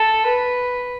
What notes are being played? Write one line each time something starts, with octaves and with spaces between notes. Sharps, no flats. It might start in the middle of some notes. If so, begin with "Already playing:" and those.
Already playing: A4
B4